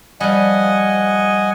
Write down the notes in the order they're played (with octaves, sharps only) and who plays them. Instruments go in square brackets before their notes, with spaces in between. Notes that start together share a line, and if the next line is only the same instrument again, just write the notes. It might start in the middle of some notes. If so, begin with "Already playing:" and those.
[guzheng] F3 G3 [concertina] D#5 F#5 G#5